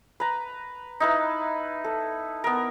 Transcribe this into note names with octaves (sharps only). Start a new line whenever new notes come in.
B4 A#5
D#4 E4 B4
A4
B3 A#4